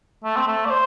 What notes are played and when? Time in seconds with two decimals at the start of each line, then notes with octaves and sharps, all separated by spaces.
0.24 A3
0.37 C4
0.47 A3
0.65 D5
0.70 C5